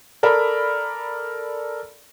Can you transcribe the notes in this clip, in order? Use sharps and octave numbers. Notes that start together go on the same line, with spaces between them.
A4 A#4 D5 B5